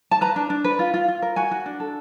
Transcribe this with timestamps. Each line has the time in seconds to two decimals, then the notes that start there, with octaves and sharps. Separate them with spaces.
0.11 A5
0.21 B4 A#5
0.36 D4
0.50 D4
0.64 B4
0.79 F4
0.94 F4
1.08 F4
1.22 A#4
1.36 F#4 G#5
1.51 F#4
1.66 D4
1.80 A4